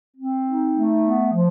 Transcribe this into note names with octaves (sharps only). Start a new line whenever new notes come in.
C4
D#4
A3
B3
F3